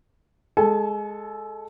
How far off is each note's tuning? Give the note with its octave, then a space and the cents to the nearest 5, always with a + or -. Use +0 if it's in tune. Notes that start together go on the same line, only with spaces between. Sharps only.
G#3 +5 A4 +0 G#5 +40